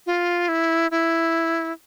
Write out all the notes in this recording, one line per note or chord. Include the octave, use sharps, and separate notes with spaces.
F4
E4
E4